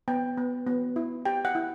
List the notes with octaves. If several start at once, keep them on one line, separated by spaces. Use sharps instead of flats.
B3 G5
B3
B3
E4
G4 G5
F#5
E4